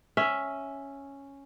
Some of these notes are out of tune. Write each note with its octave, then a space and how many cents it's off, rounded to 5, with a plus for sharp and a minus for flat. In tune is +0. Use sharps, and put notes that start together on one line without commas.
C#4 +0 E5 +0